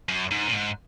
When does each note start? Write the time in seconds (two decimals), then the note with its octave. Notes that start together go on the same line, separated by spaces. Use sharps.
0.09 F#2
0.31 G#2
0.48 A#2
0.53 G#2